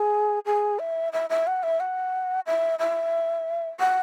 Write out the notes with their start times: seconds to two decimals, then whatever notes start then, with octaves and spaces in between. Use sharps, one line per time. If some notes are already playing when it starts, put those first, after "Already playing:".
Already playing: G#4
0.46 G#4
0.79 E5
1.13 E5
1.30 E5
1.47 F#5
1.63 E5
1.80 F#5
2.47 E5
2.79 E5
3.80 F#5